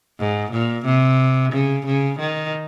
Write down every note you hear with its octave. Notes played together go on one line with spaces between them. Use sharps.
G#2
A#2
C3
C#3
C#3
D#3